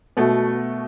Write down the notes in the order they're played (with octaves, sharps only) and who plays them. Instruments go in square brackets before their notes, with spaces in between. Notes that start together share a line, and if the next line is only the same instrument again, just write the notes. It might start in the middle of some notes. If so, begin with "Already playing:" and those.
[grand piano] B2 A3 F#4